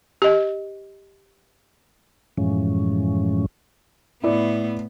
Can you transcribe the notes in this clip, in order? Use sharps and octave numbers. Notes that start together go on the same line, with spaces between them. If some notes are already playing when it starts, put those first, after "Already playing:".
G4 D#5
F#2 A2 E3 F3 G#3 C#4
A2 B3 E4 D5